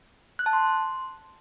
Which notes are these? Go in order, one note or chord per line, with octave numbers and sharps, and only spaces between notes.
F#6
A5
C6